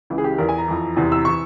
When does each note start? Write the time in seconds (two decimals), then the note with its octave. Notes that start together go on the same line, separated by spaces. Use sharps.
0.10 C#2 C#3 E3
0.18 G#4
0.24 G4
0.38 E2 E3 A#4
0.49 G#5
0.58 A#5
0.68 F2 E3
0.96 E2 C3 E3
1.12 E6
1.25 E3 C#6